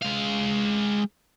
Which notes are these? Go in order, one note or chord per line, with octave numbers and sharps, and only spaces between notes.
G#3 F5